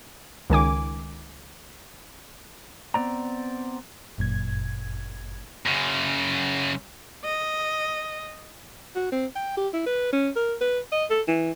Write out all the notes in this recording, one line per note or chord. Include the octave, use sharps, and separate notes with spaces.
C#2 D#3 G#5 D6
B3 C4 D5 A#5
G1 F#2 A#2 G#6
F#2 C#3
D#5
F#4
C4
G5
G4
E4
B4
C#4
A#4
B4
D#5
A4
E3